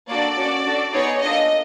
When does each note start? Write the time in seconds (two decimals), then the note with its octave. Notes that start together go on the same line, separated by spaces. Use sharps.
0.08 A#3 D4 F#4 A4 D5
0.37 C#4 F#4 A4
0.65 D4 F#4 A4
0.93 B3 D#4 G#4 C#5
1.21 A#3 D4 F4 A4 D#5